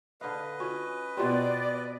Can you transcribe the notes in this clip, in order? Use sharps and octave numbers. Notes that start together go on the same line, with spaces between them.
D3 B4 D#5 F5
C#4 F4 F#4
B2 B3 C4 F4 G4 D5